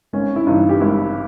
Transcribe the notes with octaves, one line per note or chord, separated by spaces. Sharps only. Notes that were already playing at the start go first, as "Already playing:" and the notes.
G#1 C#4
E4
G2 E3 D#4
G4
G#1 E4